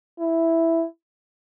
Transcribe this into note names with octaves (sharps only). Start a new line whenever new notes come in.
E4